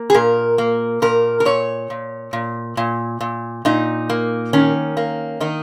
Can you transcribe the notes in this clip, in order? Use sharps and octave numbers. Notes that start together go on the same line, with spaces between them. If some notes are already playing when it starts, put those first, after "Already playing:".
Already playing: A#3
G#4
A#2 A#4
A#3
A#2 A#4
A#4
A#2 C#5
A#2
A#2
A#2
A#2
A#2 D#4
A#3
D#3 C#4
A#3
D#3 D#4